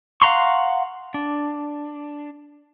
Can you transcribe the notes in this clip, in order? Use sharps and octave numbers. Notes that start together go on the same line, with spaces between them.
F5 F#5 A#5 C6 C#6
D4